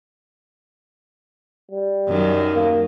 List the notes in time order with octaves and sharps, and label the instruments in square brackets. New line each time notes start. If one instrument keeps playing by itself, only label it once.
[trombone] G3
[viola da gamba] F#2 D#3
[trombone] A#3